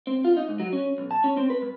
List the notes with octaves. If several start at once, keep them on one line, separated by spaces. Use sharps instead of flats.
C4
F4
D#4
G#2
F#3
C#4
B1
A5
C#4
C4
B4
G2